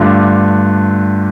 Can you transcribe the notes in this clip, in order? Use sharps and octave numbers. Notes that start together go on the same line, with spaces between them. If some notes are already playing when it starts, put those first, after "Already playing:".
Already playing: G2 D3 A3 D4 F4